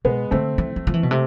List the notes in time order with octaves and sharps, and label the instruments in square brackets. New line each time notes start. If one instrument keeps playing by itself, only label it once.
[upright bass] B2 [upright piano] G#3 B3
[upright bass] D3 [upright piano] A3 C4
[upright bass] E3
F3
F3
E3
B2
[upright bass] C3 [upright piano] A3